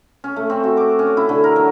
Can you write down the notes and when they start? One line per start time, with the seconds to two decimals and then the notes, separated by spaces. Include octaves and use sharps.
0.24 C#4
0.36 A3
0.50 C4
0.64 F#4
0.77 D6
0.99 C#4
1.17 E4
1.29 D3
1.44 A#4
1.56 F#3